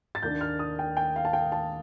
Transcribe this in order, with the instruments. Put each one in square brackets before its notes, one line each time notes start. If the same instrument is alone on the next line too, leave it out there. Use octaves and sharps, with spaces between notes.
[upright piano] A6
D#2 D#3 A#3 D4 G6
F6
D#6
G5
G5
F5
A5
G5
A5